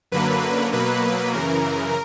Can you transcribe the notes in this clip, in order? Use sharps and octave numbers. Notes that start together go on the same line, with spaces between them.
F#2 D3 F#3 A#3 B4
B2 F#3 A#3 B4
F#2 C#3 E3 A#4